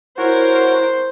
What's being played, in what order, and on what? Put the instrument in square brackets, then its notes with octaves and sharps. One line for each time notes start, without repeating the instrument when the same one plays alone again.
[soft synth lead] E4 [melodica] F#4 C#5 F#5 [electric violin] A#4 [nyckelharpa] C5